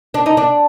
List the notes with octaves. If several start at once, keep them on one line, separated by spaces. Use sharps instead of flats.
D4
D#4
D4